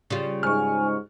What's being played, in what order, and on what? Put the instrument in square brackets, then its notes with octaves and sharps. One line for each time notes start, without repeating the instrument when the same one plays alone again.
[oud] C#3 G3 F4
[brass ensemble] G#2 [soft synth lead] G#5 [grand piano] C#6 F6